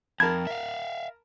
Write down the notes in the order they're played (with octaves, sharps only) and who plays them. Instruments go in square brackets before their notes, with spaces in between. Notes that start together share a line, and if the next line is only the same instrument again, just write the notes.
[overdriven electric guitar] F2 [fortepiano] A#4 A5 B5 [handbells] G#6
[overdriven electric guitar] E5 F5